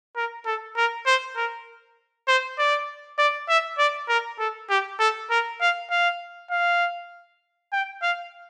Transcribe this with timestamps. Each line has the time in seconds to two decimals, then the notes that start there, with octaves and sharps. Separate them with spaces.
0.16 A#4
0.46 A4
0.77 A#4
1.06 C5
1.36 A#4
2.28 C5
2.58 D5
3.18 D5
3.49 E5
3.78 D5
4.09 A#4
4.39 A4
4.70 G4
5.00 A4
5.30 A#4
5.61 F5
5.91 F5
6.51 F5
7.73 G5
8.02 F5